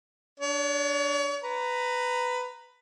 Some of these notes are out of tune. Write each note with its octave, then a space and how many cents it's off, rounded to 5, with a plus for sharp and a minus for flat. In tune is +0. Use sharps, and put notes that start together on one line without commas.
D4 +0 C#5 +40
B4 +15 A#5 +0